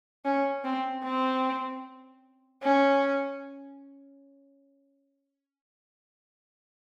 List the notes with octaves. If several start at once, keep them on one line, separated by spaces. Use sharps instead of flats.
C#4
C4
C4
C#4